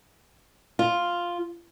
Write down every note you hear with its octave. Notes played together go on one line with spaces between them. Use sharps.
F4